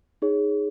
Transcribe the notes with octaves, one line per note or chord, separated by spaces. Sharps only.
D#4 G#4 C#5